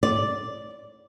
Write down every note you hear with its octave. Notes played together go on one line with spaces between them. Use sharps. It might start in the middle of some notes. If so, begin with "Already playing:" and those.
D5